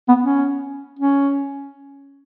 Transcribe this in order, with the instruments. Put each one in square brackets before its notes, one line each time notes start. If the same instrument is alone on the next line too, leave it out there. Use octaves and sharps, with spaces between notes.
[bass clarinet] B3
C#4
C#4